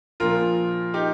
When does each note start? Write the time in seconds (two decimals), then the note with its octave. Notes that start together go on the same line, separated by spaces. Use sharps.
0.20 A#1 A#2 F3 F4 A#4
0.94 D#4 G4